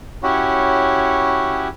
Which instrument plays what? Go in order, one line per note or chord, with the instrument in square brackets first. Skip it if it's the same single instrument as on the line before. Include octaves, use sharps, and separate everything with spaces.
[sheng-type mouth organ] C#4 E4 F#4 G4 C#5